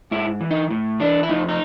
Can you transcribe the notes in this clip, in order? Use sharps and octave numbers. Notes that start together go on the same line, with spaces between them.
G#2 E4
E3
D#4
A2
E3 D4
E4
F2 D#4
D#4